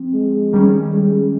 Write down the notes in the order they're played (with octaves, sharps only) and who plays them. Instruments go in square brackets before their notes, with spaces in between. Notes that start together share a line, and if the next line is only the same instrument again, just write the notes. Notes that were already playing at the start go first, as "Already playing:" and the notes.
Already playing: [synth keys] F3 C4
[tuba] G#3
[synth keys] D#3 G3 C#4
[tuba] G#3